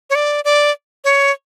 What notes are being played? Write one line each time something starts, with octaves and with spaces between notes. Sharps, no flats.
C#5
D5
D5
C#5